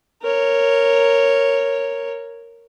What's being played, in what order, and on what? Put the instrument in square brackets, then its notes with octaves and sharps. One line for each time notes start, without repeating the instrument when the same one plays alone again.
[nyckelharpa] A#4 C#5